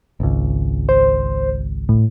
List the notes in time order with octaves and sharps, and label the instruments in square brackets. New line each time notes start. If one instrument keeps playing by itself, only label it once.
[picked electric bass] G#1 C#2
[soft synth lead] C5
A2